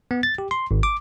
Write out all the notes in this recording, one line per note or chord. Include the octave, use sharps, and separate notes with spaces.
B3
A6
G4
C6
G#1
D6